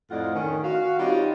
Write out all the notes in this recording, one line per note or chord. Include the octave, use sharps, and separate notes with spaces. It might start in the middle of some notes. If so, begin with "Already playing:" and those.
F2 A2 F4 D5 D#5 F#5
D#3 C#4
F#4 F5
G3 C4 C#4 D#4 F4